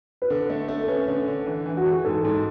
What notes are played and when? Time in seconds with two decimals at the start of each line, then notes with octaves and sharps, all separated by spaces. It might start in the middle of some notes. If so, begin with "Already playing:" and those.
0.22 B4
0.30 D3 A4
0.50 A3
0.69 A3
0.83 A4
0.88 C#4 B4
1.08 D3
1.28 D3
1.46 E3
1.66 E3
1.77 F#4
1.86 E3
1.92 G#4
2.04 G#2 A4
2.25 G#2